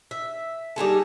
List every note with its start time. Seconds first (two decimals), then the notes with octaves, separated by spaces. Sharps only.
0.11 E5
0.76 G3 D#4 G#4 A4